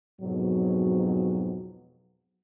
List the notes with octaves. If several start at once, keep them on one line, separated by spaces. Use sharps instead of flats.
F2 G#2 B2 F#3